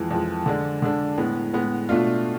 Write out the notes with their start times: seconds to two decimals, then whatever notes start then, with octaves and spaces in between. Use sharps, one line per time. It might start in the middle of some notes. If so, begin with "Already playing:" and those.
Already playing: F2 E3 G#3
0.11 F2 E3 G#3
0.46 D3 G#3 D4
0.82 D3 G#3 D4
1.17 A2 G#3 B3
1.53 A2 G#3 B3
1.89 B2 A3 D4 F4